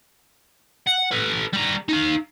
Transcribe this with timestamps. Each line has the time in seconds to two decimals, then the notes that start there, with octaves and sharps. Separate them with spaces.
0.87 F#5
1.11 A4 B4
1.53 G3 A#5
1.88 D#4 F5